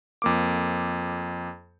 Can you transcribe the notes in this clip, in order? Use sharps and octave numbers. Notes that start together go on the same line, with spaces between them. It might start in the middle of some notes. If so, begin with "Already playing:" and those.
F2 A#3 D6